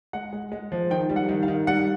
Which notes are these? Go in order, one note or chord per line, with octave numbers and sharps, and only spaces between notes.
G#3 F#5
G#3
G#3
F3
D#3 G5
G3
F#5
D#3
F5
D#3
G3 F#5